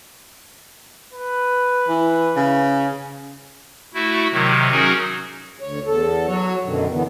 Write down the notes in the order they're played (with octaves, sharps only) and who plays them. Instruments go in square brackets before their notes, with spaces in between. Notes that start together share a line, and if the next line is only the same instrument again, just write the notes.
[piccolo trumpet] B4
[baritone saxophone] E3
C#3
[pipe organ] A3 E4 F#4
C3 D#3 F#3
F#3 C#4 D#4 F#4 G#4 A#4
[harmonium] D2 C#5
E2 A4
F#3 F#4 C#5
F#2 B2 D3 D#3
D3 E3 B3